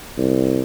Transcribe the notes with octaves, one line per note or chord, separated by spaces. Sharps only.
C2